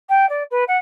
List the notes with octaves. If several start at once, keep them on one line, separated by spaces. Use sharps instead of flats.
G5
D5
B4
F#5